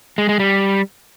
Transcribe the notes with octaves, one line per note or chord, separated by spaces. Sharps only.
G#3
G#3
G3